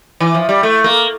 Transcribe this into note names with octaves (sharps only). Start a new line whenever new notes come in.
E3
F3
G3
A3
A#3